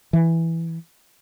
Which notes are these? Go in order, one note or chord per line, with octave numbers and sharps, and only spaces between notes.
E3